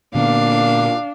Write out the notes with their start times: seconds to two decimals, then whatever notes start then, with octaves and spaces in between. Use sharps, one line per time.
0.15 A#2 D3 A#3 B3 D4 F5